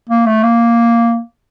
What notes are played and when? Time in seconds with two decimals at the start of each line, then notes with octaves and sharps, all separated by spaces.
0.09 A#3
0.26 A3
0.43 A#3